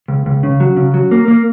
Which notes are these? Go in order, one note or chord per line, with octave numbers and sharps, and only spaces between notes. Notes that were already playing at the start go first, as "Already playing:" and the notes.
C#2
C#2
C#3
F#3
C#3
F#3
A#3
A#3